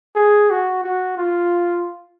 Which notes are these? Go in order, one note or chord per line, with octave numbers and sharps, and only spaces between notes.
G#4
F#4
F#4
F4